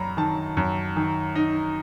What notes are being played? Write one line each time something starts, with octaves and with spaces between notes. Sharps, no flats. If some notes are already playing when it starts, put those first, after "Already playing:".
Already playing: F#2 F#3 A#5 B5
D#3 A5
F#2
D#3
D#4